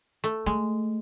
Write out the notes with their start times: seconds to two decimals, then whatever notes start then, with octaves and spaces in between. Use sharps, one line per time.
0.24 A3
0.46 G#3 A3